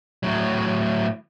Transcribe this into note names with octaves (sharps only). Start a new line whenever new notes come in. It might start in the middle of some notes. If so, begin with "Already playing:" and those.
A2 F#3